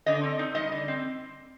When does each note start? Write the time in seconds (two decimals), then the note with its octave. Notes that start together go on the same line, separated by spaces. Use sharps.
0.06 D3 D#5
0.23 C4
0.39 D#4
0.55 G3 D#5
0.72 D3
0.88 C4